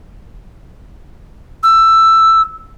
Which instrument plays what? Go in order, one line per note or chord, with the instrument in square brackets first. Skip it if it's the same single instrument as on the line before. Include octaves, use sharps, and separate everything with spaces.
[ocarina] E6